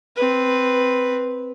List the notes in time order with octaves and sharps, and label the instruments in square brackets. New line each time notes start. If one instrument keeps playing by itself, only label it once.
[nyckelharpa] C4 B4